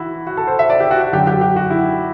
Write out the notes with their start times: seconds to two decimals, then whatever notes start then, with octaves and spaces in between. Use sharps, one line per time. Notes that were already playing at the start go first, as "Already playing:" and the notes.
Already playing: E3 E4 F#4
0.27 F#4
0.37 A4
0.47 C5
0.59 E5
0.70 D5
0.80 G4
0.91 F#4
1.02 F#4
1.13 F#2 D3 F#3 G4
1.27 G4
1.41 G4
1.56 F#4
1.70 E4